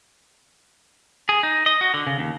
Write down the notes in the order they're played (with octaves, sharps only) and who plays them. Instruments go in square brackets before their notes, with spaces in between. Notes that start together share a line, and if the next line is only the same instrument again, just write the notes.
[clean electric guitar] G#4
D#4
D#5
F#4
D3
C#3
D#2